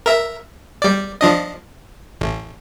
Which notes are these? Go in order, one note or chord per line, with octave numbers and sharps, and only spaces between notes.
A#4 E5
G3 D5
F3 D4 D#5
A1